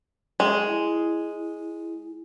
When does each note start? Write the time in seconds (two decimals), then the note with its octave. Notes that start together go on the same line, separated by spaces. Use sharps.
0.40 G#3
0.66 E4